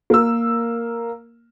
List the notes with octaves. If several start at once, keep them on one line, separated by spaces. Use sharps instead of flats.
A#3 A#4 E6